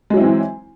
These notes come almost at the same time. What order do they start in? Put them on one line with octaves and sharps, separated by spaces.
G#3 F#3 E4 C4 E3